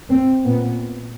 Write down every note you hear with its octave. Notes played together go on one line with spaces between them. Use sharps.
C4
A#2 B3